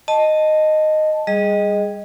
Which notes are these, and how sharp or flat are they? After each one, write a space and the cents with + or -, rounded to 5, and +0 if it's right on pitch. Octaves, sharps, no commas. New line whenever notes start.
D#5 -5 A5 +0
G3 +15 G#4 +0 D#5 +0